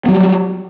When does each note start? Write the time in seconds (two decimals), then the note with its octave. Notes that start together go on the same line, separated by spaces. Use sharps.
0.06 B3
0.08 F#3
0.11 G3